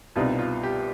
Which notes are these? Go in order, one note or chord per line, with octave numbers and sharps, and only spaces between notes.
C2 B2 G3 C4 D#4 F4
F4
G4